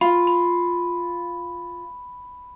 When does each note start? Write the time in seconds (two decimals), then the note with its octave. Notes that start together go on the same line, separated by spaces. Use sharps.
0.01 F4 B5
0.27 B5